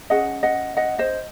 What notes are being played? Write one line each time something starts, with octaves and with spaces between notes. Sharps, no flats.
C#4 G#4 D#5 F#5
D#5 F#5
D#5 F#5
C5 D#5